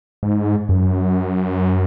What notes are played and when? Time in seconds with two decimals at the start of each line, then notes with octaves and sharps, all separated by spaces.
0.23 G#2
0.69 F#2